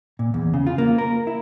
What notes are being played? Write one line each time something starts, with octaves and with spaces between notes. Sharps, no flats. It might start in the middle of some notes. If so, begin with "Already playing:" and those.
A#2
E2
C#3
F4
A#3
A#4
E4